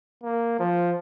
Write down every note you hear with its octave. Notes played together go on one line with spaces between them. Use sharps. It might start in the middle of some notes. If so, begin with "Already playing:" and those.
A#3
F3